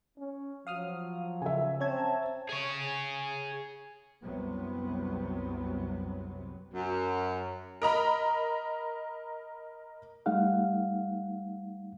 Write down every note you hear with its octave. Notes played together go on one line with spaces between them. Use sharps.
C#4
F3 F#3 F5 D#6 F6
C#3 E5 G#5
C4 C#4 C#5 A5 A#5 G#6
G#4 C#5
C2 F#2 C3 F#3 B3
F#2
A#4 D#5 A#5 B5
G3 A3 D#4 F5 F#5